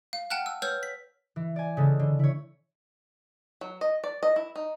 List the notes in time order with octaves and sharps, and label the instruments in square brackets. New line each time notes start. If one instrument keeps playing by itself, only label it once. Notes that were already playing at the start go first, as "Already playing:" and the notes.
[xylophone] F5
F#5 G5 A5 F6 F#6
E6
B4 C#5 E6 F6 G6
B6
[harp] E3
D5 G#5
C#3 G#3 A4
D3
E4 C#5
[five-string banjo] F#3
D#5
D5
D#5
E4
D#4